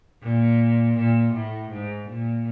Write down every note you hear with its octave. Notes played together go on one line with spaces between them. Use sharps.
A#2
A#2
A2
G#2
A#2